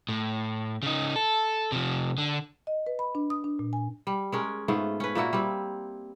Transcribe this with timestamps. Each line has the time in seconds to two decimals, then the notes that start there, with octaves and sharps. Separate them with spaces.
0.09 A2
0.83 C#3 D#4
1.16 A4
1.72 C3 F3
2.18 D3
2.67 D#5
2.87 B4
2.99 B5
3.15 D4
3.30 D#6
3.44 D4
3.59 A#2
3.73 G#5
4.07 G3
4.32 G#3 C#4 A#4
4.68 G#2 A3 B3 F4
5.00 C#4 B4
5.15 A#2 A#3 E4 F#4
5.33 G3 C4